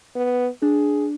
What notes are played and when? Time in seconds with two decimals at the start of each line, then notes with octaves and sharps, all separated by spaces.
0.16 B3
0.62 D4 G#4